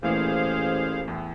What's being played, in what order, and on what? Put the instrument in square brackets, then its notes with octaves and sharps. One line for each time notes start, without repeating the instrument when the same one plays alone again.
[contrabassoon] A1 [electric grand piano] A#2 E3 A3 [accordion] G#4 C5 F5
[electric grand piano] E2 A2